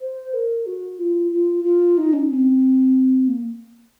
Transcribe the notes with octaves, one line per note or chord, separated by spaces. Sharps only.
C5
A#4
F#4
F4
F4
F4
D#4
C#4
C4
A#3